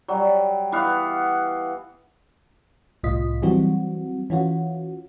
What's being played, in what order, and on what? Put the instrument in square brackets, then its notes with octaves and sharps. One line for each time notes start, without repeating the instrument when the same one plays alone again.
[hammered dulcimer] F#3 G3
E3 B3 F5 F#5
[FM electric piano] C2 A2 F4 D#5 B6
E3 F#3 G3 C4 F#4
E3 C#4 F4 F#4